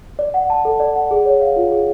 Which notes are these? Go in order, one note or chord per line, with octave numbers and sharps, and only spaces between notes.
D5
F#5
A5
A4
D5
F#5
G#4
C#5
F5
F4
G#4